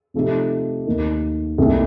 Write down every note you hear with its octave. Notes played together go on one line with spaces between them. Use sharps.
C3 F3 A3 D#4 G4
D#2 D#3 A#3
C2 A#2 A3 D#4